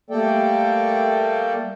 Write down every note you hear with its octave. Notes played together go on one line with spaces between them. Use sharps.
G3 A3 A#3 A4 D5 G5